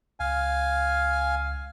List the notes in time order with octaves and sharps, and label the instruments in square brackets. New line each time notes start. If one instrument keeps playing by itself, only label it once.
[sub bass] C#2 [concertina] F5 G#5